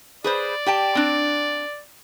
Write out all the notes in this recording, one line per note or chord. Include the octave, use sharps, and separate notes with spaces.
G#4 B4 C5 D5
G4 G5 A5
C4 D4